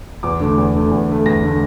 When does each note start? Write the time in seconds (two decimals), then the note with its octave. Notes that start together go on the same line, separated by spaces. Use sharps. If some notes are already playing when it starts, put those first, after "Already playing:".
0.23 E2 D6
0.40 D3 A3
0.58 E2
0.75 D3 A3
0.91 E2
1.09 D3 A3
1.26 E2 A#6
1.43 D3 A3